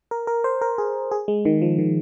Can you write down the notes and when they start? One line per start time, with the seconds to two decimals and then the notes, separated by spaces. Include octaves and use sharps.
0.11 A#4
0.27 A#4
0.44 C5
0.61 A#4
0.78 G#4
1.11 G#4
1.28 G#3
1.45 D#3
1.62 F3
1.78 D#3